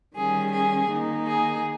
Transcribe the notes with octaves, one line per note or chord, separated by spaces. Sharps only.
D#3 G3 C#4 G#4
G#4
D#3 A#3 D#4
G#4